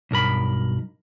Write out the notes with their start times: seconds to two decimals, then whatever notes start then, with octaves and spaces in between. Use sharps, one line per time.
0.11 B1 G2 A#4 B5